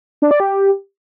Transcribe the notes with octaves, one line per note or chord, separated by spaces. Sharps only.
D4
D5
G4